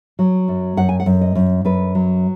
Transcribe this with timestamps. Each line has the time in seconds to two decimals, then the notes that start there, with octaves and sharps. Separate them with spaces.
0.19 F#3
0.48 F#2
0.77 F#2 F#5
0.89 G#5
1.00 F#5
1.06 F#2
1.21 D#5
1.35 F#2
1.65 F#2 B4
1.95 F#3